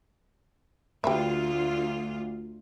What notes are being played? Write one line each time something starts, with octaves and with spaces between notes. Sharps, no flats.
D2 F4 G4 B4 E5